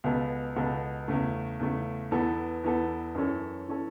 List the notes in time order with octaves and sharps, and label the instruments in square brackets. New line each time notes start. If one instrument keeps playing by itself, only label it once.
[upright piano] C#2 B2 B3 A4
C#2 B2 B3 A4
E2 C#3 A3
E2 C#3 A3
E2 E3 B3 A4
E2 E3 B3 A4
F#2 E3 C#4 A4
E3 C#4 A4